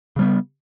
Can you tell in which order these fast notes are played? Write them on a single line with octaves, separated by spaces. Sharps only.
C#3 G3 B3